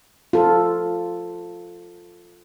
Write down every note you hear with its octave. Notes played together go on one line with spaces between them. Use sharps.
F4 A4